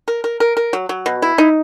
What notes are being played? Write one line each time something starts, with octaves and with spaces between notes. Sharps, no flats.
A#4
A#4
A#4
A#4
F#3
F#3
B2
E4
D#4